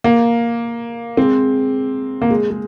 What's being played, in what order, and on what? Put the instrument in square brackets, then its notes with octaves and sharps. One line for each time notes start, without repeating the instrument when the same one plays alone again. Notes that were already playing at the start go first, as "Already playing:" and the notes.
[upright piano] A#3
G#3 C4
A#3
G#3
G#3